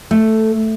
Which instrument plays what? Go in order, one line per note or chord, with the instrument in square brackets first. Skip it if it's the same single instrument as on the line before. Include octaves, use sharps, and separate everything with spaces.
[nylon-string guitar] A3